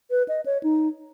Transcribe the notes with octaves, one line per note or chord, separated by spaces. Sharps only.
B4
D#5
C#5
D#4